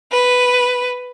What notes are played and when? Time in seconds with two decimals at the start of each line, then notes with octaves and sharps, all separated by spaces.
0.12 B4